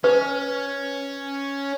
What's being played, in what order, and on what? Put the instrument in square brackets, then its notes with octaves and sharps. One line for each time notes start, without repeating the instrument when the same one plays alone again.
[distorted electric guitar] C#4 [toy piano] B4